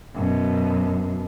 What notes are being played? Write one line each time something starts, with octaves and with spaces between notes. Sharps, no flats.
F#2 B2